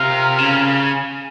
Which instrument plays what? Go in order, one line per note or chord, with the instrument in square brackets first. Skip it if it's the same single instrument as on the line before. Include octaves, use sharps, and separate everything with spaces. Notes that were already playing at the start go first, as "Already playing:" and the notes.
Already playing: [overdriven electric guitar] C3 [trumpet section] F4 A#4 F5
[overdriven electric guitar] C#3